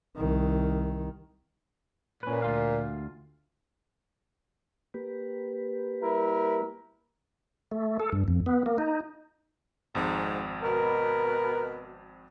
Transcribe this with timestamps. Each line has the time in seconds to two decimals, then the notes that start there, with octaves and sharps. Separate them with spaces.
0.16 C2 D#3
2.23 A#2 C#4 B4
2.42 D2 F4 F5
4.94 A#3 G4 B4
6.03 G3 E4 A#4
7.72 A3
8.00 A4
8.12 G2
8.28 F2
8.46 B3
8.66 A#3
8.78 D#4
9.95 G#1 F2 G#2
10.62 B2 A#4 B4